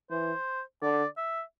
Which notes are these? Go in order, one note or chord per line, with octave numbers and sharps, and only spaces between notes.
E3 C5
D3 D5
E5